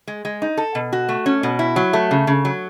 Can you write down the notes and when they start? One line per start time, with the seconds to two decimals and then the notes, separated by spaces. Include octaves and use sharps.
0.08 G#3
0.25 G#3
0.42 D#4
0.57 A4
0.75 B2
0.92 F#4
1.09 A3
1.26 C#4
1.43 B2
1.59 E4
1.76 F#3
1.93 A3
2.11 C#3
2.27 C#3
2.45 F#3